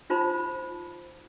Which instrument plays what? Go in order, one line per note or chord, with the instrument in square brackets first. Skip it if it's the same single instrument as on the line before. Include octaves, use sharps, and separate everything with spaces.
[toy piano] D#4 F4 C5 A5 B5